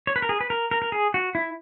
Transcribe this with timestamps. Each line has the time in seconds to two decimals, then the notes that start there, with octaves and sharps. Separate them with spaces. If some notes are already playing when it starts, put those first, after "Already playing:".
0.07 C#5
0.16 B4
0.22 A#4
0.29 G#4
0.41 B4
0.50 A#4
0.71 A#4
0.82 A#4
0.92 G#4
1.14 F#4
1.35 E4